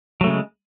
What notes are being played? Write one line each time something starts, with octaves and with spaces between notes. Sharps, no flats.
C#3 F#3 G#3 A3